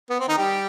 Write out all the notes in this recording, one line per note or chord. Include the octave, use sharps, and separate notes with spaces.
B3
C4
D#3 D#4
G3 G4